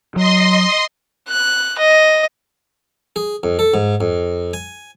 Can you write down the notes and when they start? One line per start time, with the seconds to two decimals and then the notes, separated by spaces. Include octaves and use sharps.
0.16 F#3 D#5 C6
1.28 F#6
1.79 D#5
3.16 G#4
3.43 F2
3.59 A4
3.74 G#2
4.01 F2
4.53 G#5